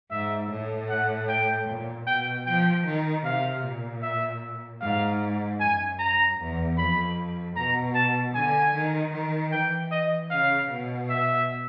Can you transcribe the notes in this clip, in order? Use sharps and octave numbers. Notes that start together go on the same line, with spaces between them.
G#2 E5
A2
F#5
G5
A#2
B2 G5
F3 G5
D#3
C3 F5
A#2
E5
G#2 F5
F#2 G#5
A#5
E2
F2 B5
B2 A#5
A5
D3 G#5
D#3
D#3
E3 G5
D#5
C#3 F5
B2
E5